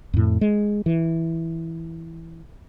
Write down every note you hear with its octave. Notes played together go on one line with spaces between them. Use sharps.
F2 A2
G#3
E3